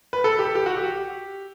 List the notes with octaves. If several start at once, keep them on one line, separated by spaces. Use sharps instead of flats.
B4
A4
G4
A4
G4
F#4
G4